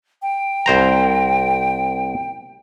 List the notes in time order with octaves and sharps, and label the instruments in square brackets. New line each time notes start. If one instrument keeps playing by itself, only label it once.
[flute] G5
[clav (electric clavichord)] C2 C5 A#5